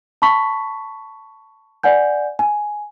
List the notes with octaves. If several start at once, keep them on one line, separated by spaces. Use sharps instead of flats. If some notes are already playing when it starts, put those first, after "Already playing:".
A5 B5 C#6 B6
D5 F#5 G#5 G6
G#5